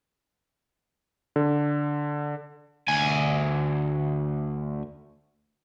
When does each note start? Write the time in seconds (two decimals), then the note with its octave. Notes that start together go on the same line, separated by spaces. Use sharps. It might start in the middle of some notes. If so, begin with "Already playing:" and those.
1.36 D3
2.88 D2 G#5